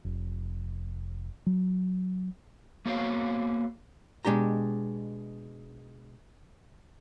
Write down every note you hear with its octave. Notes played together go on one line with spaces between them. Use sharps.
F1
F#3
A#3 B3 F#4 C5 C#5 F5
B2 G#3 D4 G4 A#5